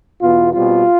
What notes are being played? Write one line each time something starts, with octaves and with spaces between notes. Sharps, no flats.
E2 B2 B3 F4
B2 G3 C4 F4